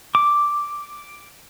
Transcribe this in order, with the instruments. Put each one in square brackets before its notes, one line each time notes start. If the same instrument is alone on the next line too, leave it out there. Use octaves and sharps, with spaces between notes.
[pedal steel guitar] D6